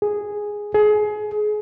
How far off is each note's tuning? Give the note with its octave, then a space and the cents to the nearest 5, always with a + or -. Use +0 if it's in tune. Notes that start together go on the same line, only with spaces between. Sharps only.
G#4 -5
G#4 +25